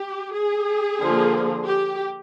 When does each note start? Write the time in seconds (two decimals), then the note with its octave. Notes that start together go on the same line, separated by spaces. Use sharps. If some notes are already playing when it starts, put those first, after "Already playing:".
Already playing: G4
0.34 G#4
1.00 D3 F3 A#3
1.65 G4